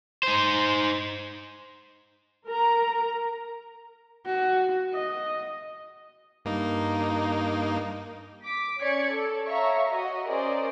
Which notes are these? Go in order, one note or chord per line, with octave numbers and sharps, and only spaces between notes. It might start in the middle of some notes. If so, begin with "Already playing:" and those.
D#4 C5
A#4 A#5
F#4
D#5
G2 A#3 D#4
D6 B6
C#4 C#5 D5 G#6 C#7
A4
C#5 E5 F5 A#5 C#6
F#4 D#5
C#4 G#4 A#4 C5 D5 D#5